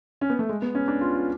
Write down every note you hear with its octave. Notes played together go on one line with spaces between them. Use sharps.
C#4
B3
A3
G#3
B3
C#4
D4
F4
F4